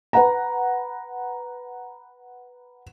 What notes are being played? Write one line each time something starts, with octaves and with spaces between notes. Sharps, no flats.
B4 F#5 A#5